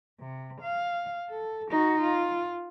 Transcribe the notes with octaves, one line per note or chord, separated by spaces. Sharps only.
C3
F5
A4
D#4 F#4
F4